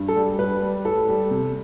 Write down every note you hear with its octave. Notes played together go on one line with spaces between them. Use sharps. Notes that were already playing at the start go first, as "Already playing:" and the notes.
Already playing: G2
A4
G3
G3 B4
G3
A2 A4
G3
C3